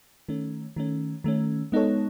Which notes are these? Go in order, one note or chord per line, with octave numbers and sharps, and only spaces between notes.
D#3 A3 C#4
D#3 A3 C#4
D#3 A3 C#4
G#3 B3 D#4 A4 C#5